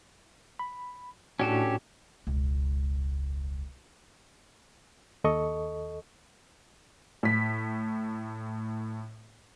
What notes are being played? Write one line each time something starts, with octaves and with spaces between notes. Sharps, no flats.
B5
A2 C#4 D4 F#4 G4 A4
E1 C#2
D#2 A4 D#5 C#6
A2 B6